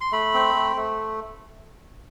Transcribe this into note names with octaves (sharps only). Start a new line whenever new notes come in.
C6
A3 B5
C4
A3
A3